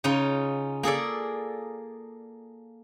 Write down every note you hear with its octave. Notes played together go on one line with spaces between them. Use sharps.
C#3 C#4 D#4 F4
A#3 G#4 A4 D5